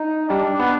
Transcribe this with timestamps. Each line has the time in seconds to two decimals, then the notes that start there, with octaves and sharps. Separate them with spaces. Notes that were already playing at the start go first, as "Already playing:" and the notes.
Already playing: D#4
0.29 G3 D4
0.59 B3